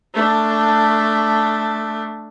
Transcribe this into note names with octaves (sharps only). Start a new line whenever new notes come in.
A3 D4